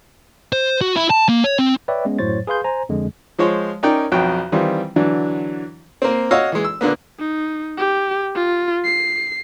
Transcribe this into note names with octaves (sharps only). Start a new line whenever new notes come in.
C5
F#4
E4
A5
A#3
C#5
C4
B4 C#5 D5 E5 G5
G#3 B3 C#4
F#2 A2 F#3 C5 C#5 A6
G#4 B4 F5 C6 G6
C5 G#5 A#5
F2 D3 G#3
F3 G#3 C5 C#5
C#4 D#4 A#4 D5 G5
B1 F2 F#4 C#5 G5
D#3 E3 G3 C4 F4
D3 E3 F#3 D4
A#3 C4
F#4 C#5 D#5 F5 E6
E3 G#3
E6
A#2 D3 A#3 B3
D#4
G4
F4
C7